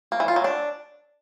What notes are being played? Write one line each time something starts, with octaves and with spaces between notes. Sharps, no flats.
A#3
E3
F4
F#3
D4